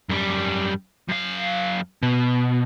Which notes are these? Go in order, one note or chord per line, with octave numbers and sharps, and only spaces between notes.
F#2 G3
F#2 F5
B2